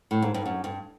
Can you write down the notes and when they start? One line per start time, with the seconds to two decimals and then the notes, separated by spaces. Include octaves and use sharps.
0.11 A2
0.22 G#2
0.34 G2
0.46 F#2
0.64 G2